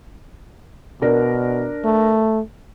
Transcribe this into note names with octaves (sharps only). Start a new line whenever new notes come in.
B2 D4 A#4
A3